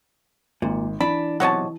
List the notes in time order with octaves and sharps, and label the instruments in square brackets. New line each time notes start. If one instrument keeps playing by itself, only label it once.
[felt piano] G#1 [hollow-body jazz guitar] A#2
[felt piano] E3 [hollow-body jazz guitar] D4 [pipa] B5
[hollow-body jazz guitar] B1 C3 A5 [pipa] F#4 C#5 D#5